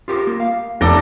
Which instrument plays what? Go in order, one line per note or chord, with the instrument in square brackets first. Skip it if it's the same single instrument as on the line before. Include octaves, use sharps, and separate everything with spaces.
[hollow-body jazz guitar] F4 G4 A#4
A#3
F5
[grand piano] F1 F2 G7 [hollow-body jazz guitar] D#4 [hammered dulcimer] A4 D5 A#5